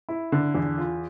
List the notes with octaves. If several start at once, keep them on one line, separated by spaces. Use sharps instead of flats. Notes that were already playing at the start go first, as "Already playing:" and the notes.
E4
D3
E2
F4